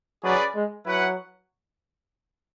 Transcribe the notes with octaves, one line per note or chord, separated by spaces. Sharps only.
F#3 C#4 G#4 B4 D5
G#3
F#3 E4 B4 F#5